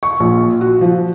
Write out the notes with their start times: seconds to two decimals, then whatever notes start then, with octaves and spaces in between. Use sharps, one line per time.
0.03 C#6
0.20 A#1
0.61 F#4
0.81 F3